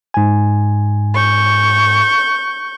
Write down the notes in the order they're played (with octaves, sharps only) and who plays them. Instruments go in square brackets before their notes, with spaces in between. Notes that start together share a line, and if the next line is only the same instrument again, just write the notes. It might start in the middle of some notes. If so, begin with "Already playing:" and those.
[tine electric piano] G#2 G#5
[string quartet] C#6 G6